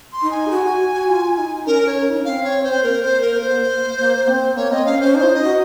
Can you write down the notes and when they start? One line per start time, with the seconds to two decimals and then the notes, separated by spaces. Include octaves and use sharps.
0.13 C6
0.22 D#4
0.31 G#5
0.47 G#4
0.51 F#4
0.66 F#4
0.94 F#4
1.09 F4
1.38 D#4
1.67 C#4 A#4
1.87 C#5
2.09 D#4
2.17 C#4
2.25 C4 F5
2.44 C#5
2.64 C5
2.83 A#3 A#4
3.03 C5
3.21 A#4
3.41 C5
3.99 A#3
4.28 C4
4.57 A#3 C#5
4.71 C4 D#5
4.85 C#4 F5
5.00 C#4 C5
5.15 D#4 C5
5.23 F4
5.29 D#4
5.34 D#5
5.44 F#4